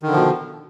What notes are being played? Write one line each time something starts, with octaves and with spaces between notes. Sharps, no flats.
B2 D3 D#3 F3